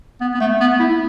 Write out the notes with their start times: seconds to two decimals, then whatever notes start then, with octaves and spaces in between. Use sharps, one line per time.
0.21 B3
0.34 B3
0.40 A3
0.61 B3
0.79 E4